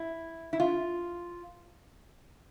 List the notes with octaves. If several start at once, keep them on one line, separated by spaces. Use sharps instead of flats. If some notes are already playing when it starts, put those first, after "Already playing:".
Already playing: E4
E4
F4